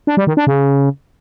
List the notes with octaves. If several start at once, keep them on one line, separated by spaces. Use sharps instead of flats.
D4
G3
D#3
D4
C#3